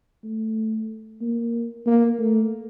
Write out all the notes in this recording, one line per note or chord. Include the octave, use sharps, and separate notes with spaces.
A3
A#3
A#3
A3